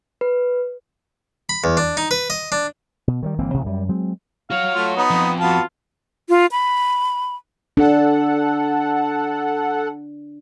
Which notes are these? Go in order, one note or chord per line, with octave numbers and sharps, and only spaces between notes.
B4
B5
E2
D4
D#4
B4
D#5
D4
B2
D#3 F#3 G3
G1 E3 A#3 C4
A1 C3
F#2 G3
F#3 G#3 C4
F#4 C#5 F5
A3 F4
B3 D#4
F2
B3 F4 F#4 A5
F4
B5
D4 A4 F#5